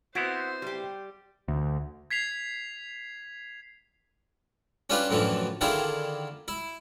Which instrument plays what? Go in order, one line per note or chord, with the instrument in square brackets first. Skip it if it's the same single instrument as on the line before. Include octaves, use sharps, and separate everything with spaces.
[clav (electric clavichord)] B3 C4 E4 [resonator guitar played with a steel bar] F#4 [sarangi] C5
[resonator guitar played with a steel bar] G3 G4
[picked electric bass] D2
[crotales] G#6 B6 C7 F7
[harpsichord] C#4 D4 F4 G4 B4
F#2 A2 D3 E3 F3
D3 D#3 E4 F4 G4 G#4
E4